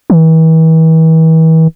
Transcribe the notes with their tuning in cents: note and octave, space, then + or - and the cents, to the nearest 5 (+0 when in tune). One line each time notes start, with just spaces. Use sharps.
E3 -40